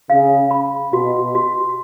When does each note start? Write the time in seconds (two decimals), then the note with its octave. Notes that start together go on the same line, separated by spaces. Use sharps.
0.10 C#3 F5
0.51 B5
0.93 B2 F#4
1.35 F#4